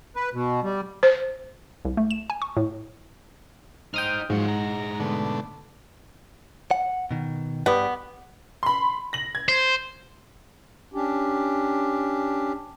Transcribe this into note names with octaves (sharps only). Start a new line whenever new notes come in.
B4
B2
G3
C5
C2
A3
E7
G#5
C#6
A2
D#4 C5 G5 D#6 F6
G#2 F3 F#3 G#3 F#5
A#5
B2 D3 A3
F#5
B2 D#3
G2 B3 G4 D5
B5 C6
A#6 F#7
G#6
C5
C#4 D4 G4